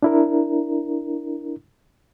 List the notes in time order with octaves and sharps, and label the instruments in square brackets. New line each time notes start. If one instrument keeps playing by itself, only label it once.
[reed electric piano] D4 E4 A#4